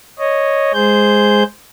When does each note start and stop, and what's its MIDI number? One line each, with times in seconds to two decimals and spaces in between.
0.19 0.72 73
0.19 0.72 75
0.74 1.44 56
0.74 1.44 68
0.74 1.44 72
0.74 1.44 91